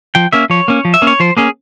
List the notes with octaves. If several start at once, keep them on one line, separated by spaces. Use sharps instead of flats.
F3 G5
A#3 C#4 E5
F3 C#5
A#3 C#4
F3
E5
A#3 C#4
C#5
F3 C5
A#3 C#4 G#4